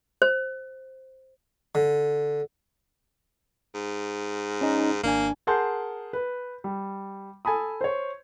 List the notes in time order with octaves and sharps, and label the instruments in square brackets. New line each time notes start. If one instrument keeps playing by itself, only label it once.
[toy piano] C5
[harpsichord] D3
[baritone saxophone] G#2
[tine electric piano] C#4 D#4
[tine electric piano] G#1 D4 G#5 [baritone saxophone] A#3
[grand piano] G#4 A#4 F#5 A5 C6 G6
B4
G3
A4 G#5 A5 B5 D#6
C5 C#5